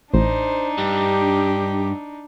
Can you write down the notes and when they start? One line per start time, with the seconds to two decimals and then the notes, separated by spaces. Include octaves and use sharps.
0.14 A1 D4 D#4 C5
0.78 G2 G4